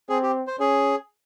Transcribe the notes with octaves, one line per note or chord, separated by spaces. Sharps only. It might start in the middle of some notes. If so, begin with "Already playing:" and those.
C4 G#4
G4
C5
C#4 G#4